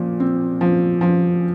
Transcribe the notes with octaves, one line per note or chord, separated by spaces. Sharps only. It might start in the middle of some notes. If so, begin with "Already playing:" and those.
Already playing: A#2 F3
C4
F3
F3